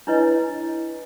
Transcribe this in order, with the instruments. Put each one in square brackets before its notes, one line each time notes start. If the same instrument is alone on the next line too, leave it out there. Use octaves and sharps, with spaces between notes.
[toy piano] D4 E4 B4 C#5 D#5